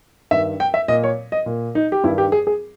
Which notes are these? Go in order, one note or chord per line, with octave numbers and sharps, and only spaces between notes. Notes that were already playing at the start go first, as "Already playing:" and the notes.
G2 D#3 E5
G5
E5
A#2 D#5
C#5
D#5
A#2
D#4
G4
G2 D#3 E4
G4
G#4
G#4